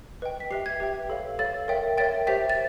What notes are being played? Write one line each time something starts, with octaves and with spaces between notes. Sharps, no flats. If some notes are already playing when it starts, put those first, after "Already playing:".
B4 D#5 G5
B6
G4 B4 E5 G5 C7
G#6
G4 B4 E5 G5
A4 C#5 F5
A4 C#5 F5 A6
A#4 C#5 E5 G5
A#4 C#5 E5 G5 A6
G4 C5 E5 G5 B6
A6